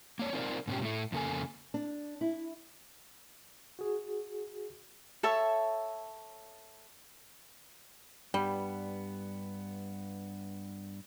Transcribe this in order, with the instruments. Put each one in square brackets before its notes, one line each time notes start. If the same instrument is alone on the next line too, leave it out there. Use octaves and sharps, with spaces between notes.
[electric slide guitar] A#3 C#5 D5
C4 D#4 F4 A#4 C5 D5
G#2 B2 C#4 G4
A2 A3
F2 C#3 A#3 A4 G#5
[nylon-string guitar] D4
E4
[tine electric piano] F#4 G#4
[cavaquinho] A4 C#5 E5 A5
[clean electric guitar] G2 B3 [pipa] G3